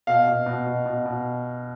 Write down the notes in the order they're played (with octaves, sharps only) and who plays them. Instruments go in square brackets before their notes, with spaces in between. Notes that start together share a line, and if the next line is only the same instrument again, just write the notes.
[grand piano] B2 F5
B2
B2
B2
B2
B2